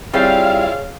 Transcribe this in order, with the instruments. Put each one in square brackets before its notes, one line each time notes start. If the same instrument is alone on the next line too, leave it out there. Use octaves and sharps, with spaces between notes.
[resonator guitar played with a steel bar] G3 C4 [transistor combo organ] E4 F4 [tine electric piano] G#4 C#5 [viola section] F5